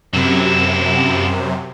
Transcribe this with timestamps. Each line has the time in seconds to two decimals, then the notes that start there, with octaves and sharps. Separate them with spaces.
0.13 F#2 C3 F#3 E4